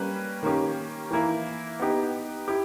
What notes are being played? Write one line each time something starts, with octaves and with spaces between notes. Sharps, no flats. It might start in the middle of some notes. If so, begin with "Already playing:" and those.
Already playing: G3 A#3 C#4 G4 B4
D#3 A#3 C#4 G4
E3 A#3 E4
B3 D#4 G4
E4 G4